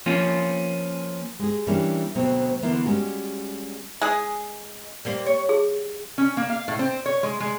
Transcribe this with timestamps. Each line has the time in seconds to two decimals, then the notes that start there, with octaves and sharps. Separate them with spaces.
0.06 F3 A#3 C#4 F4
1.39 G#3 G#4
1.67 E3 G3 A#3 C#4 D4
2.15 D2 B2 F#3 A3 C4
2.62 D3 E3 A#3 B3 E4 F4
2.85 G3 G#3 C#4 F#4
4.01 G#3 G#4
5.05 G3 A#3 C4
5.26 C#5
5.49 G#4
6.18 C#4
6.37 A#3
6.50 F5
6.68 A2
6.79 C4
7.06 C#5
7.23 G#3
7.40 G#3